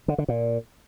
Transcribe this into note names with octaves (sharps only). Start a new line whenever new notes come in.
D3
D3
A#2